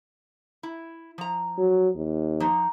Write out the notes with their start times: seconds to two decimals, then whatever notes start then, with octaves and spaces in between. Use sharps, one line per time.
0.63 E4
1.18 F3 A#5
1.58 F#3
1.96 D#2
2.40 F3 D#4